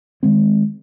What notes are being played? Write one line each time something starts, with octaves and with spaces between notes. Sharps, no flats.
D#3 G#3 C4